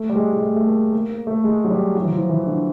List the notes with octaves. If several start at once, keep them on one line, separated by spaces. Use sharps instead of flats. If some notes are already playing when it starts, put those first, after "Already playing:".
Already playing: A3
G3
G#3
G#3
A3
A3
A#3
A#3
A#3
A3
G#3
F#3
G3
F#3
E3
F3
E3
D3